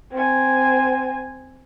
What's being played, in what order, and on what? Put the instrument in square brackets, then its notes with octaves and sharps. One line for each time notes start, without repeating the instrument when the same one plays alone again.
[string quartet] C4 G#5